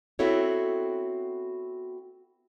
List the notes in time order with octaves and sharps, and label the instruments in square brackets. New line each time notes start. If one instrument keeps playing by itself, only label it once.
[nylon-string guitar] B3 C4 E4 F#4 A4 C#5